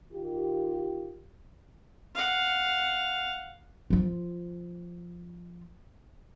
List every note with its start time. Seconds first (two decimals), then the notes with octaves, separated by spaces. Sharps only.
0.12 D#3 F4 G4
2.15 F5 F#5
3.90 F3 F4